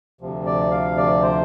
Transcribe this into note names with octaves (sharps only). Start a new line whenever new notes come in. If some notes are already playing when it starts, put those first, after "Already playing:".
D2 C3 F3
D5
F5
D5
C5